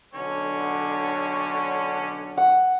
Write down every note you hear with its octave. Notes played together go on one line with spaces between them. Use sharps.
B1 D3 C#4 C#5
F#5